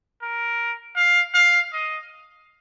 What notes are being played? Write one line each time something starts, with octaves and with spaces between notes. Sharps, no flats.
A#4
F5
F5
D#5